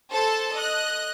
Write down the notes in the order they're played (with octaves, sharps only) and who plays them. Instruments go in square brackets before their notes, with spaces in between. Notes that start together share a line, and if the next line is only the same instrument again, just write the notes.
[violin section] A4 C5 A5
D#5 F#6